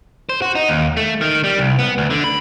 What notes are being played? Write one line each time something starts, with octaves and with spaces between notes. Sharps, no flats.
C5
F#4
D#4
D#2
A3
D#3
G3
C2
B3
D2
D3
B5